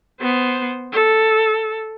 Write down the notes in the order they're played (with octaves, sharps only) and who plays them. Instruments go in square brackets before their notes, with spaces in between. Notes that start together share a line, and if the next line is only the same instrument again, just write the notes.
[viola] B3 C5
A4